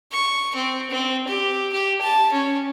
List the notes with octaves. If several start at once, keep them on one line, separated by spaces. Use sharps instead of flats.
C#6
C4
C4
G4
G4
A5
C#4